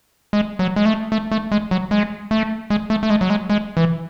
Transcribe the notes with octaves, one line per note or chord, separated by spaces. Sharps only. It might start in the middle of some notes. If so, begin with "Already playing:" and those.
G#3
F#3
G#3
A3
A3
A3
G#3
F#3
G#3
A3
G#3
A3
A3
G#3
F#3
G#3
G#3
E3